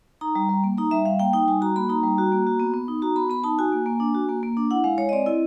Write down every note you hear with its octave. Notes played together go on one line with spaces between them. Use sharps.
D#4 A#5
G3
G3
A#3
D#4 A#5
G3 E5
G3 F5
A#3 G5
D#4 G5
G3 G#5
F#4 A#5
A#3 B5
D#4 A#5
G3
F#4
A#3
F#4
B3
B3
D#4
F#4 A#5
B3 B5
B3 B5
D#4 A5
F#4 G#5
A#3
A#3
D4
F#4
A#3
A#3
D4
E4 F#5
G#3 F5
G#3 C#5
D#5
C4 D5
E4 D#5